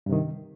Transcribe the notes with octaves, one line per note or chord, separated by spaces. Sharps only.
G2 C3 D#3